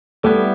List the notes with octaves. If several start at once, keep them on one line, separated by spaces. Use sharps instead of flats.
G3 A3 B3 E4